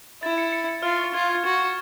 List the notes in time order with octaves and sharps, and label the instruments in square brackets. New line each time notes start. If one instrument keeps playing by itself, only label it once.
[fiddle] E4 [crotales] A6
[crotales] C#7
C#7
C#7
[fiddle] F4 [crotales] F6
[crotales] C#6
[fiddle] F4 [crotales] G#6
[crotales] G#6
[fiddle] F#4 [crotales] G#6
[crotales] E7